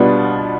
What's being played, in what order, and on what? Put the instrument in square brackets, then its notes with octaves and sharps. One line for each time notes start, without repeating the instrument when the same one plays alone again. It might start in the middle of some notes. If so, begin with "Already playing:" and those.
Already playing: [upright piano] B2 G3 B3 D4 F4